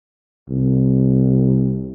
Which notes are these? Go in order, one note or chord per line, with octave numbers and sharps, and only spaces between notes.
C2